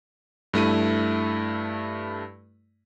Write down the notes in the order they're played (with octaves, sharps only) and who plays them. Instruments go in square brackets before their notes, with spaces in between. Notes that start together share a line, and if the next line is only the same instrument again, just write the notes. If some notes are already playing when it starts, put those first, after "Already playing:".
[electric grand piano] G2 A3 E4 D#7